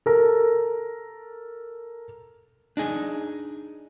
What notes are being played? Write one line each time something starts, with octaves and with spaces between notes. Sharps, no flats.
A4 A#4
D4 D#4 G#4